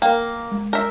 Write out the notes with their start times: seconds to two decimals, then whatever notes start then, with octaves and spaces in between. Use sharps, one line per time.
0.02 A#3 A#4 F5 G5
0.52 G#3
0.73 A#4 E5